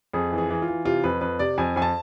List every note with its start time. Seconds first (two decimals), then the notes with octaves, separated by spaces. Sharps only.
0.14 F2 G#4
0.32 E3
0.38 G#4
0.50 E3
0.62 F4
0.68 E3
0.85 C3 F4
1.04 F2 B4
1.21 F2 B4
1.39 C3 D5
1.58 F2 G#5
1.76 F2 G#5
1.82 A5